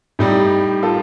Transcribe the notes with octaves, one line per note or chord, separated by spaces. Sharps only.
A2 G3 D#4 G4
F4 A4